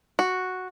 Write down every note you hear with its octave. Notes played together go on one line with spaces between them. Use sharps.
F#4